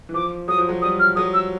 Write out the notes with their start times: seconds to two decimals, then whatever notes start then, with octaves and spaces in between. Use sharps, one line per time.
0.09 E3
0.14 F3 D6
0.48 F#3 D#6
0.58 F3
0.69 F#3
0.82 G3 D#6
1.00 F6
1.16 F#3 D#6
1.34 E6